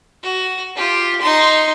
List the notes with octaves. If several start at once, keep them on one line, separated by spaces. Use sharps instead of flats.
F#4
F4 G4
D#4 C6